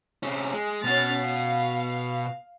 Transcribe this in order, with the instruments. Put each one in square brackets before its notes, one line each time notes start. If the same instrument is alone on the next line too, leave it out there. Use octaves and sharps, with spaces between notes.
[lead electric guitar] C3 C#4
G#3
[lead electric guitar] B2 F#4 [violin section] C#4 F6 A6
[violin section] F5